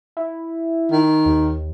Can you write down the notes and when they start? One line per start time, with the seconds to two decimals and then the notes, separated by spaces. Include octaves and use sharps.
0.17 E4
0.91 D#3
1.26 D#2